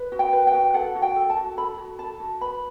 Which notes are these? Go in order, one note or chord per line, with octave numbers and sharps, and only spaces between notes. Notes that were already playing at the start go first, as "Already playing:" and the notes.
Already playing: B4
F#4
G5
B4
G5
F#4
A4 F#5
F#4
G5
A4
A5
F#4
A4 B5
F#4
A4 A5
F#4
B4 B5